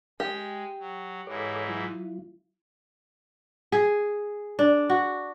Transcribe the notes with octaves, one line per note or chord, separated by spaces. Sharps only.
G#3 G4
F#3
G#2 E3 A4 C#5 D6
F#3 E4 F4
G#4
D4
F#4